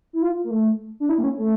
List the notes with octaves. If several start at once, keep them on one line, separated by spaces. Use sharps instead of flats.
E4
F4
A#3
A3
D4
E4
A#3
C#4
A3